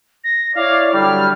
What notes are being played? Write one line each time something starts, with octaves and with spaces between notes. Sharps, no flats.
A#6
E4 C#5 D5 F5
D3 F#3 G3 F6